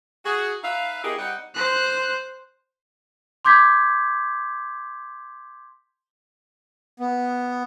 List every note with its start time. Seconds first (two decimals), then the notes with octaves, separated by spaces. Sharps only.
0.25 F#4 G#4
0.63 D#4 B4 E5 F5
1.04 B3 D#4 E4 G4 G#4 A#4
1.17 G3 C4 D#4 F#5
1.55 C5 F#6
3.45 C6 D6 G6 G#6 B6
7.00 B3